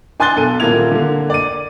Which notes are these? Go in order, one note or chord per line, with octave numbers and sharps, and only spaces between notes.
D4 G#5 C6 F#6 A6 G7
B1 A4 D#7
D#1 A#3 E4 F4 G#6 F7
D3 A#3
D5 D#7